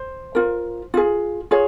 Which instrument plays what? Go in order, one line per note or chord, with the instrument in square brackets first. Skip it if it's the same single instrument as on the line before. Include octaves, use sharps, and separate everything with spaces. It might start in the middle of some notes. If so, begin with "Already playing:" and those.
Already playing: [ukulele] C5
F4 A#4
F4 G#4
F4 G#4 C#5